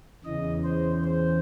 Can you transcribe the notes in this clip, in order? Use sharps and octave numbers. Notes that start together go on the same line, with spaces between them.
E2 C#3 E3 D#5
C5
C5